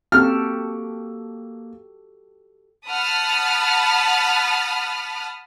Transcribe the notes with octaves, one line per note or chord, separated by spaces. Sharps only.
A#3 C4 F#4 G4 A4 F6
F#5 A5 B5 D#6 F6